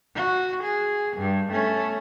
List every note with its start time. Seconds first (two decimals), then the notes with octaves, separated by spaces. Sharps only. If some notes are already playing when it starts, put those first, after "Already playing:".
0.15 F#4
0.63 G#4
1.17 G2
1.52 A3 C#4